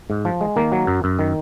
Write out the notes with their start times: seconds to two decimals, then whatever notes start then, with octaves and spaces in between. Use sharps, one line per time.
0.10 G#2
0.25 F3
0.41 G#3
0.56 D#3 A#3
0.72 F#3
0.87 F#2
1.04 F#2
1.19 D#3